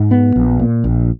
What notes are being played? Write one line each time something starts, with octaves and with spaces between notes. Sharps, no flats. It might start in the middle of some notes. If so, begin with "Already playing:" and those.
Already playing: G#2
B3
A#1
A#2
A#1